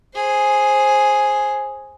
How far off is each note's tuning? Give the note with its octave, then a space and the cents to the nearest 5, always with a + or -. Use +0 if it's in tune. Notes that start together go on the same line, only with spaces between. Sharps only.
G#4 +0 C5 +15